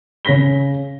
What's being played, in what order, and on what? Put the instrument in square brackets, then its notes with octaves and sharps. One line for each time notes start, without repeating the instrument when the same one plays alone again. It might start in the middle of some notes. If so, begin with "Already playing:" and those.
[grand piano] C#3 C#5 A#6 B6 G7